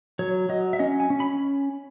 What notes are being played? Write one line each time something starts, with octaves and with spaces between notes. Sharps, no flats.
F#3 C#5
F#3 D#5
E5
C#4 D#5
G#5
C#4
B5